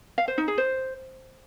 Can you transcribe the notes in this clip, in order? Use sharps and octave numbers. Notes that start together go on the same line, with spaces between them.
F5
C5
D#4
G#4
C5